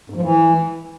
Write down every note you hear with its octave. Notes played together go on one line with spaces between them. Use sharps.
G#2
F3
E3